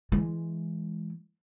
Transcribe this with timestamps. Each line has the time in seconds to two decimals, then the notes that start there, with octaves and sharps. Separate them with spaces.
0.12 E3 G#3